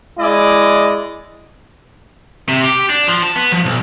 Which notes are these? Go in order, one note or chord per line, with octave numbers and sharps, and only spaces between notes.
G#3 E4 D5 D#5
C3
G4
D4
F3
A5
B3
F3
B1